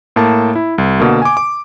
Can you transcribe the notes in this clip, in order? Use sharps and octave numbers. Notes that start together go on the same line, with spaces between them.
A2 A#3 A5
E4
C2
B2 D3 A#3
G#5 D6
D6